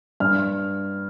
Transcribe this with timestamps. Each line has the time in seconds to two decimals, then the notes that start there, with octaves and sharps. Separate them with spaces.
0.20 G2 F6